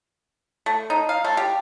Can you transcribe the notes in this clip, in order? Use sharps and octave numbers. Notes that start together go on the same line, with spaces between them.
A3
D#4
F5
A3
G4